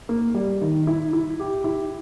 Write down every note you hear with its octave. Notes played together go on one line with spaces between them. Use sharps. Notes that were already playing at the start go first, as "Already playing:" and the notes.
A#3
G3
D#3
E4
E4
G4
E4